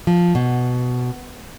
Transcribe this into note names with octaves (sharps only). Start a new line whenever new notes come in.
F3
B2